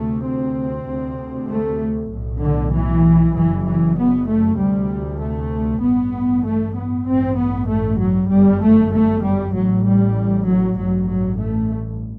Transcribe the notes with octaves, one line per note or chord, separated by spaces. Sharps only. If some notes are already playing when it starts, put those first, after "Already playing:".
Already playing: D2 C3 A3
C4
D2 C3
A3
B1 A2
D3
E3
F#1 F#2 E3
E3
B3
A3
D2 C3 G3
A3
A1 G2 B3
A3
B3
A1 G2 C4
B3
A3
F#3
G1 F#2 G3
A3
A3
G3
A1 A2 F#3
G3
F#3
A1 G2 F#3
F#3
A3